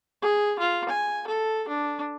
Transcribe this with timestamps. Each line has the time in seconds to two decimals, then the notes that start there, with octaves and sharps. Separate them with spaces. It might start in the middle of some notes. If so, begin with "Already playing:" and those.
0.22 G#4
0.59 F4
0.89 G#5
1.27 A4
1.68 D4